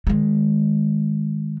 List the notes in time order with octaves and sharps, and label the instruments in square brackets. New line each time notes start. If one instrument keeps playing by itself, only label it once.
[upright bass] D#3 G#3